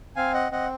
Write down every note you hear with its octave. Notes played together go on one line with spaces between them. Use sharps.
C4 F5 G#5
D#5 F#5
C4 D#5 F#5